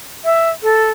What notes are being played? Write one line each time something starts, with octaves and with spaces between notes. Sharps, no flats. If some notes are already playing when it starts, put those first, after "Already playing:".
E5
A4